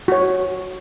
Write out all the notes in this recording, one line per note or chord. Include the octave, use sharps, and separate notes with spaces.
F#4 C#5